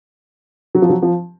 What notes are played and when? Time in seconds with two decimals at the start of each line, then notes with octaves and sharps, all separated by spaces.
0.75 F#3
0.82 F3
0.89 F#3
1.02 F3